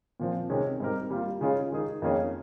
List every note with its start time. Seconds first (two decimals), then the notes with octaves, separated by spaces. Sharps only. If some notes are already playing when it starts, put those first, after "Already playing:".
0.20 A#2 F3 C4
0.50 C3 D#3 G#3 C#4 G#4
0.80 G#2 G3 C4 G4 A#4
1.10 G3 A#3 F4
1.41 C#3 G#3 C#4 F4 G#4
1.71 D#3 G#3 D#4 G#4
2.02 F2 D#3 A#3 C#4 G#4